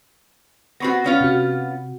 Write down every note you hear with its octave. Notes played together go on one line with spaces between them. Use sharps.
B3 C4 F#4 B5 C#6 A#6
B3 C#4 F4
C3 F#4